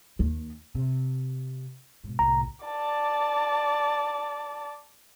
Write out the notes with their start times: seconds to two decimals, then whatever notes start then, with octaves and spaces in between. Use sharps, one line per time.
0.19 D#2
0.75 C3
2.04 G#2 B2
2.19 C2 A2 A#5
2.65 D5 A5